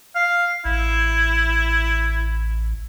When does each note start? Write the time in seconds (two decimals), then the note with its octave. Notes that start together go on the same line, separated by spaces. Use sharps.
0.15 F5
0.65 A1 E4